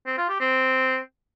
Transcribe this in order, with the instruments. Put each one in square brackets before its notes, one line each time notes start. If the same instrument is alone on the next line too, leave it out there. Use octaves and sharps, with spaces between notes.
[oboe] C4
F4
G4
C4